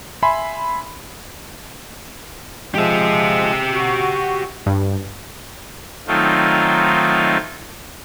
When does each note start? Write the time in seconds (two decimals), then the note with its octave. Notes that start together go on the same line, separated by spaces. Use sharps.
0.23 E5 G#5 B5 C6
2.75 F3 G#3 G4 E5
3.73 F#4
4.66 G2
6.07 D#3 F#3 A3 C4 D#4 F4